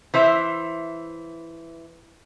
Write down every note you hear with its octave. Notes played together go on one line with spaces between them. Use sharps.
E3 C5 E5